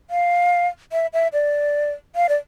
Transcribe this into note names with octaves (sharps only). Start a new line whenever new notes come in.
F5
E5
E5
D5
F5
D5